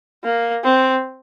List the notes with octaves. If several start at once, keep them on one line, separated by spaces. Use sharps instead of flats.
A#3
C4